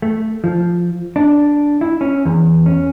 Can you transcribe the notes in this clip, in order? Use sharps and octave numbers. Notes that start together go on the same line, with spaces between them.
A3
F3
D4
E4
C#4
E2
C#4